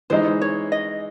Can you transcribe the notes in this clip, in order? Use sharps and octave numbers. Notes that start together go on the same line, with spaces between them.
E3 G#3 D#4 C5
C#5
D#5